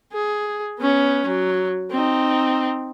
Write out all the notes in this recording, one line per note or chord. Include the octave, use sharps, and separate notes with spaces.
G#4
B3 C#4
F#3
C4 D#4